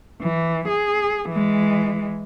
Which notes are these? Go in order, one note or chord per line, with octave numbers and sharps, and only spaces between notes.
E3
G#4
E3 G#3